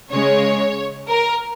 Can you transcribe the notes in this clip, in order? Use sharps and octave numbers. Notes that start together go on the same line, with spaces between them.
C#3 G#3 C#5
A#4